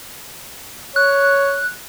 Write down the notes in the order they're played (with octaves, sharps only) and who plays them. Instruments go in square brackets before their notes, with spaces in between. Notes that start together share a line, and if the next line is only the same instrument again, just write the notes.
[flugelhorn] C#5 [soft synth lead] F#6